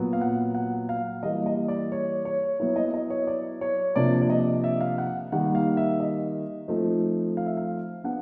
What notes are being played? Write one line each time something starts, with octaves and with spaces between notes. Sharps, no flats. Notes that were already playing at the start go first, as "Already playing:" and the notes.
Already playing: A#2 F#3 B3
F5
F#5
F#5
F5
E3 G3 A#3 D#5
D#5
D5
C#5
C#5
F#3 B3 E4 C#5
D#5
D#5
C#5
D5
C#5
C3 F3 A#3 D4 D5
D5
D#5
E5
F5
F#5
D#3 G3 A#3 F#5
F5
E5
D#5
F3 A3 C4 D#4
F5
E5
F5
B3 D4 F#5